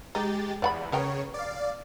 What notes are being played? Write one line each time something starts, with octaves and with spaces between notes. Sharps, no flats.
G#3 D#4 G4 A6
E2 D5 F#5 B5
C#3 B3 A#4 C#5 G5
D5 F5